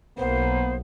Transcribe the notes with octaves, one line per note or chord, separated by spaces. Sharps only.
B1 A#3 B3 C5